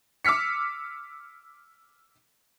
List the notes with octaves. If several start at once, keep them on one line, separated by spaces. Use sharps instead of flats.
D6 E6 F6 B6 C#7